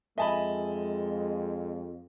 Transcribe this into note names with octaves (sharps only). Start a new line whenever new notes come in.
F2 G#3 D#5 E5 G#5 A5 B5